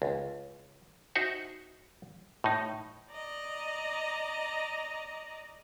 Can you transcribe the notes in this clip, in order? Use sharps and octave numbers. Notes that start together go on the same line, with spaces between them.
C#2
D#4 F#4 C5 E5 F#5
A2 D#4
D5 D#5 A#5